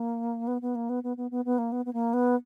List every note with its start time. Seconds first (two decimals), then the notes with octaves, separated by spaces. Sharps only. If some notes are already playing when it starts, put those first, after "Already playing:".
Already playing: A#3
0.47 B3
0.61 B3
0.75 A#3
0.89 B3
1.03 B3
1.17 B3
1.31 B3
1.45 B3
1.58 A#3
1.72 B3
1.85 B3
1.93 A#3
2.13 B3